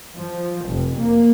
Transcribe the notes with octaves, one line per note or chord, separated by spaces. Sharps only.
F3
F1
A#3